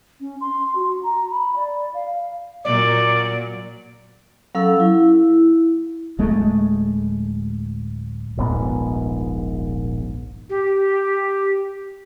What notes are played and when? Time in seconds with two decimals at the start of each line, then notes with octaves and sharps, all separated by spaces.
0.21 C#4
0.41 C6
0.75 F#4
1.03 A#5
1.31 B5
1.56 D5
1.94 F5
2.64 A#2 F#3 D5
4.55 F#3 C#4 A4 F5 F#5 E6
4.80 E4
6.19 D1 G#3 A3
8.37 D#1 A#1 G#2 B3
10.50 G4